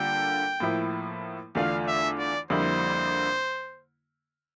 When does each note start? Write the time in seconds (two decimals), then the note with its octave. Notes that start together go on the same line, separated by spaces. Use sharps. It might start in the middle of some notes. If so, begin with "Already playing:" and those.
Already playing: D3 G3 A#3 F4 A4 G5
0.60 A2 F3 A#3 E4
1.55 E2 D3 A3 D4 F4 F5
1.87 E5
2.18 D5
2.50 F2 D3 G3 A#3 E4 C5